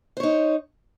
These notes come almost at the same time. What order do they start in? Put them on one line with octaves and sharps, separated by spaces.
C5 C#5 D#4